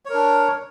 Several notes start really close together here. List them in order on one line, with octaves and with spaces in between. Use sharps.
C#5 A#4 D4